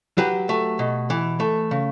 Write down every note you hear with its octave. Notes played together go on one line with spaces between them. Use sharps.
F#3 G4 B4
A3
B2
E3
A3
C#3